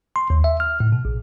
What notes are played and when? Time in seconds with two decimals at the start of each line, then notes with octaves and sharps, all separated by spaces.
0.16 C6
0.30 D#2
0.44 E5
0.60 F6
0.80 A2
0.92 B2
1.05 A#1